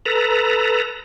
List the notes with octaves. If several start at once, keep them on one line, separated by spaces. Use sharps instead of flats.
A4 B4 A#5